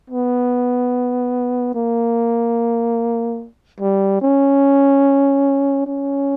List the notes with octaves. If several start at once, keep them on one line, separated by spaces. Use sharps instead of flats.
B3
A#3
G3
C#4
C#4